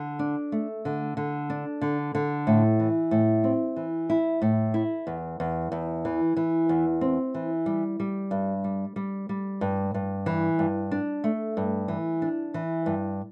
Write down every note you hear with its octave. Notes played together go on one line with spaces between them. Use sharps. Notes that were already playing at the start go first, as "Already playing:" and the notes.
Already playing: D3
D4
A3
D3
D3
D4
D3
D3
A2
E3
A2
C4
E3
E4
A2
E4
E2
E2
E2
E3
E3
E2
C4
E3
G3
G3
G2
G3
G3
G3
G2
G2
E3
G2
D4
A3
G2
E3
D4
E3
G2